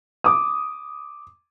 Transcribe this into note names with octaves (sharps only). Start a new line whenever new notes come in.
D6 D#6